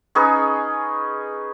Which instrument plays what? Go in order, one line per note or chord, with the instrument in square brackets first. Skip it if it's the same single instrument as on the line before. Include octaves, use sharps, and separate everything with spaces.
[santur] C#4 D#4 G#4 B4